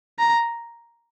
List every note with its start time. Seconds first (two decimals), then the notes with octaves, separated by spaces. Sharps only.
0.19 A#5